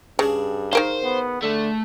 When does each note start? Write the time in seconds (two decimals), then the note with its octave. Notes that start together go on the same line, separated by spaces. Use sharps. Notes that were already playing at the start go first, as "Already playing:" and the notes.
0.19 G2 C#3 D4 G#4
0.73 D#3 A#4 C5 F5
1.04 B3
1.42 D3 A3